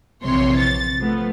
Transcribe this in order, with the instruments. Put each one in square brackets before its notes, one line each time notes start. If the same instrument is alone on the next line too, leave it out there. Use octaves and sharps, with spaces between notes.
[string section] A#1 C3 E3 C#5 C6
A6
F3 A3 B3